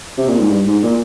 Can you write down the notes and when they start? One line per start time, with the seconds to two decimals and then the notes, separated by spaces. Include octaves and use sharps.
0.17 C3
0.28 A#2
0.40 G#2
0.50 G2
0.66 G#2
0.83 A#2